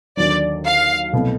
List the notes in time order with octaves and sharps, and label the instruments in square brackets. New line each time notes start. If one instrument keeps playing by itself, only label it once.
[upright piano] D#2 D3 F#3 [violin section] D5
[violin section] F5
[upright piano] C2 B2 F#3 A3